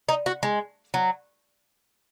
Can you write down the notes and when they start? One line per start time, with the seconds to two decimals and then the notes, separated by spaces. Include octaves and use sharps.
0.09 D#4
0.26 F#4
0.43 G#3
0.94 F#3